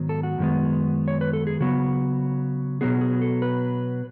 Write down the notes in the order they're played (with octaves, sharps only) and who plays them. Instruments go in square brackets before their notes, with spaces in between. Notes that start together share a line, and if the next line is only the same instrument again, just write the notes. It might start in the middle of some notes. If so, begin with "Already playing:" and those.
Already playing: [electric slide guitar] G#2 D#3 F#3 B3
A4
F#4
F#2 D#3 G#3 B3
C#5
B4
A4
G#4
C#3 F#3 B3 F#4
B2 F#3 B3 G#4
G#4
A4
B4